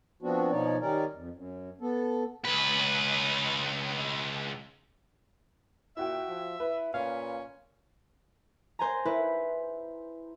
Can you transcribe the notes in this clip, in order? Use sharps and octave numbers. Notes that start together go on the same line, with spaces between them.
F3 B3 C4 D4 F#4
B2 F3 D#4 C#5 D5
D#3 G3 C#4 D#4 A#4 D5
F2
F#2
B3 A4
C#2 B4
A#2 E4 F#4 E5 G5
F3
E4 B4
A#2 C#4 F5
C5 G#5 A#5
E4 B4